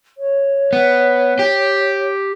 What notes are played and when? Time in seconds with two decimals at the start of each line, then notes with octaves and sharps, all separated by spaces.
0.18 C#5
0.73 B3
1.39 G4